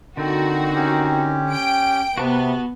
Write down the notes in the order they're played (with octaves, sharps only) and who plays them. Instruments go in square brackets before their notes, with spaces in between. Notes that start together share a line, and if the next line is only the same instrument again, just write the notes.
[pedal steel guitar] D3 [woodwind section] D#3 C4 D#4 [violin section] F#4
[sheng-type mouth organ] C#4 G4
[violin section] G5 D7
[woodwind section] C3 [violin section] B3 [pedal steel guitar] F#4 A5 F#6